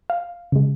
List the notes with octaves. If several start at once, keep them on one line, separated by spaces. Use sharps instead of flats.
F5
C#3 G#3